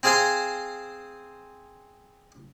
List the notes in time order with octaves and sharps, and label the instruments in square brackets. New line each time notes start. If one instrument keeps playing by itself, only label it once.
[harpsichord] C4 G#4 C5 F5 G#5 C6